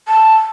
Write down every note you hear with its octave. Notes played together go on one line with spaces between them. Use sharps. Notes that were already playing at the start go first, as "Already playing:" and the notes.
A5